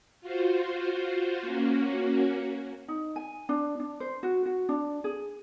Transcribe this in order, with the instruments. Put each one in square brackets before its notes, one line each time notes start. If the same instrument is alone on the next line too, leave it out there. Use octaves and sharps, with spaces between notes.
[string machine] F4 F#4 C5
A#3 C#4 F#4
[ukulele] D#4
G#5
D4
D4
C5
F#4
F#4
D4
G#4